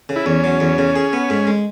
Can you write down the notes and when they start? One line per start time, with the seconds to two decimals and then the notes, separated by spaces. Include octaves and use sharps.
0.09 C#3
0.16 E4
0.26 E2 C#4
0.44 F#3
0.60 E2
0.78 C#3
0.96 G#4
1.13 B3
1.30 G#2
1.47 G#3